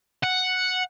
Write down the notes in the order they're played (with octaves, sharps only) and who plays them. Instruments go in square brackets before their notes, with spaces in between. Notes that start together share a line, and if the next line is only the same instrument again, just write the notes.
[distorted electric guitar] F#5